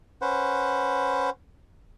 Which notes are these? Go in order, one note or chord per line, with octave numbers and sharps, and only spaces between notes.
C#4 B4 C5 F#5